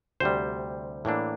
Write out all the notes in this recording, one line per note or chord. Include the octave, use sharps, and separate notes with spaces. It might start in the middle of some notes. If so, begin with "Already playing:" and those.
D2 C3 G3 C5
A2 E3 A#3 D4